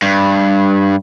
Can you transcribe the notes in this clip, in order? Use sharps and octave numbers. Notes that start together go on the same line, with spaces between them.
G2